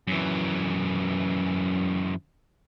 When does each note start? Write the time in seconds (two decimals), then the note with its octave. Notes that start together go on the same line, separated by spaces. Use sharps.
0.07 F#2 E3